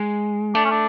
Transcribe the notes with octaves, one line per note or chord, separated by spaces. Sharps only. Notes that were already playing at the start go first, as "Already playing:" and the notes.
Already playing: G#3
A3 D4
C#4
D4